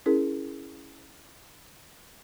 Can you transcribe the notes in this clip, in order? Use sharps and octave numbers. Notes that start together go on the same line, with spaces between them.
C#4 E4 G#4 A#4